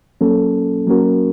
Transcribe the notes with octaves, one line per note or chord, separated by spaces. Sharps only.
F#3 A#3 C#4 A4
F#3 A#3 C#4 F#4 A#4